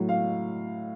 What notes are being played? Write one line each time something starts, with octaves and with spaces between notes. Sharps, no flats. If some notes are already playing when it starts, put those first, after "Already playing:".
Already playing: A2 F#3
F5